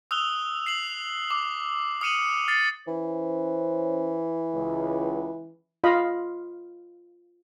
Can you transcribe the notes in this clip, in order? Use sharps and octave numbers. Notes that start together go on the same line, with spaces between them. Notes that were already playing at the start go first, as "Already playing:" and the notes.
D#6 E6 F#6 F7 G7
C7 E7 F#7
D6
D#6 F6 C#7 D#7 E7 F#7
F6 A6 C7 C#7
E3 C#4 C5
C#2
F4 D#5 F5 B5